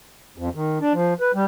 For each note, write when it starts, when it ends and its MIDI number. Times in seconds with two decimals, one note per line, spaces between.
0.38 0.49 41
0.55 0.78 51
0.81 0.93 62
0.94 1.14 53
1.20 1.32 71
1.34 1.45 55